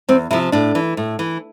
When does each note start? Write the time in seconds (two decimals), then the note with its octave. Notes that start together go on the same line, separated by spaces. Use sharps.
0.09 E2 C4
0.31 C3 F3 E4
0.52 A2 D4
0.75 E3
0.97 A2
1.19 E3